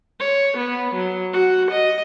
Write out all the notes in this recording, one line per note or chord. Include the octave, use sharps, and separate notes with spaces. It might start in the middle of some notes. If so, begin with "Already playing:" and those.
C#5
B3
F#3
F#4
D#5